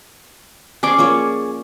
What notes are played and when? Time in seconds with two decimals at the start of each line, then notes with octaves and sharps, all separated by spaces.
0.83 C#4 G#4 C5 D5 D6
0.98 F3 A#3 C#5